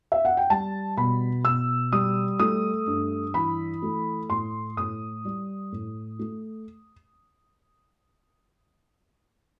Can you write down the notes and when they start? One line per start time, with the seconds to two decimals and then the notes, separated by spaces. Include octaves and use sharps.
0.12 E5
0.25 F#5
0.37 G5
0.50 G3 A5
0.97 B2 B5
1.45 B2 E6
1.92 G3 D#6
2.39 A3 D#6
2.87 G2
3.34 E3 B5
3.82 A3
4.30 A2 C6
4.77 A2 D#6
5.25 G3
5.72 A2
6.19 A3